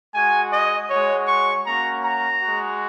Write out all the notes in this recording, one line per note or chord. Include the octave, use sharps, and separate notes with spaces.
G#3 F#4 G#5
D#5
G#3 F#4 C#5
C#6
A#3 C#4 F#4 A#5
A#5
G#3 F#4